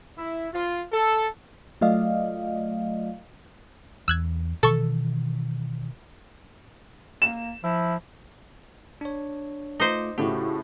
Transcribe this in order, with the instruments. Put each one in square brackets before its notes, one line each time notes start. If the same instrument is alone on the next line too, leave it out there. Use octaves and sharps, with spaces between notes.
[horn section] E4
F4
A4
[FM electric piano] F#3 A3 F4 D5 D#5 F5
[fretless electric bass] E2 [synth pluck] E6 F#6 G#6
[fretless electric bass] B2 D#3 E3 [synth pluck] A4 C#6
[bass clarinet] A#3 [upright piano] E7
[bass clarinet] F3 [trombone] E4
[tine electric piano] D4 C#5
[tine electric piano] A3 F4 D6 [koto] D#4 C5
[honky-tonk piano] A2 C#3 A3 [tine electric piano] F#4 G4